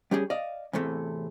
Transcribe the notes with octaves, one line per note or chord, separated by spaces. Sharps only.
G3 C#4 G4 G#4
D5 D#5 F5
E2 A2 C3 A3